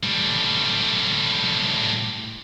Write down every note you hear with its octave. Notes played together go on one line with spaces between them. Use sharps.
A2 G3